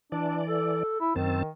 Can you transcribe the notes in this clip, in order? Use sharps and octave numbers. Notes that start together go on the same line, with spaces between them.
E3 D4 D5
A4
E4
F#2 D#3 C4 A5